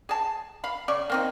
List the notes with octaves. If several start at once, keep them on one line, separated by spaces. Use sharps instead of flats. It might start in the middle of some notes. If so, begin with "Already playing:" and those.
G#4 A5
F5 B5
C#3 D5 C#6
A#3 C4 D#4